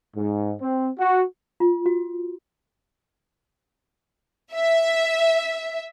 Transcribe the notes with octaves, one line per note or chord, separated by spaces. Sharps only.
G#2
C4
F#4
F4
F#4
E5